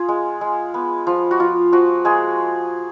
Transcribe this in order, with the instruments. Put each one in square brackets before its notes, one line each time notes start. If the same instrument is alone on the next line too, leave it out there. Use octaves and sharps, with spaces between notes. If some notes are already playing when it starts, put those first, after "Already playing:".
Already playing: [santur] F4 G#4
G#3
G#3
B3
F3
F#4
F3 F4
F3 F#4
G#3 A#3 G#4